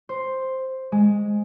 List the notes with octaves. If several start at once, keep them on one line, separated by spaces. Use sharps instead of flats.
C5
G#3